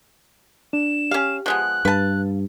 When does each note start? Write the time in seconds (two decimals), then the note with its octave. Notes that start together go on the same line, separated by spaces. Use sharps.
0.73 D4 E7
1.11 C#4 G4 F5
1.46 F3 G#3 B3 F#6
1.85 G2 B4 F5 A5